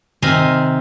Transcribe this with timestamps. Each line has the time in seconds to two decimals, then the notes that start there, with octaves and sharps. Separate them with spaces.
0.22 C3 D#3 C4 D#5 F5 G#5